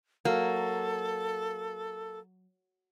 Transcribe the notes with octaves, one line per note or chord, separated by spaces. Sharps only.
F#3 A#3 A4